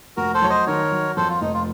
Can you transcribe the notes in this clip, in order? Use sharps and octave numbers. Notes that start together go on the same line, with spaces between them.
F1 F#4 A#4
A4 C5
F#3 C#5
C5 D#5
D#3 A#4 C#5
F#3
F2 A4 C5
F4
F1 D#4
F4